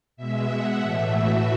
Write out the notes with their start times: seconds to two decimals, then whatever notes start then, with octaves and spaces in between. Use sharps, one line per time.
0.16 B2 G#3 E5
0.48 F#5
0.78 A2 E3 A3 E5
1.10 F#4